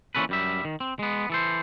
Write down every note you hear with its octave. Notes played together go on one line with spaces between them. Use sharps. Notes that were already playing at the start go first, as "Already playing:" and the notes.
A#2 E3 F#3 C#4 A4 B4
F#2 G3 E5
D#3
C4
G#3 B3
E3 A4 C5